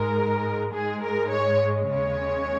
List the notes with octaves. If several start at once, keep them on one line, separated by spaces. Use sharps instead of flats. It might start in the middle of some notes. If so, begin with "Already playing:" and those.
Already playing: G#2 G#3 A#4
G#2 G#3 G#4
A#4
C#5
D#2 C#3 G#3 C#5